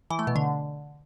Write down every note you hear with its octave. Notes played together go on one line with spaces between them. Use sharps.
E3
A3
B2
D3